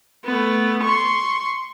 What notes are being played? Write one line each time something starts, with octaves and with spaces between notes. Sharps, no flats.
A3 B3
C6 C#6